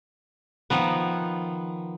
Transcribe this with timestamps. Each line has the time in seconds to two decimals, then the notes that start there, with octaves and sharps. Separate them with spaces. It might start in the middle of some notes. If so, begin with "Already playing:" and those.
0.70 D#3 F3 B3